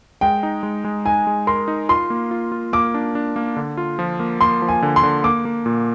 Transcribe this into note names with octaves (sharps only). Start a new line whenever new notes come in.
G#3 G5
D#4
G#3
G#3
D#4 G#5
G#3
A#4 C6
D#4
F4 C6
A#3
F4
F4
A#3 D6
D4
D4
A#3
D3
F4
F3
A#3
A#3 C6
F3
G#5
D3
C6
D3
A#3 D6
A#3
A#2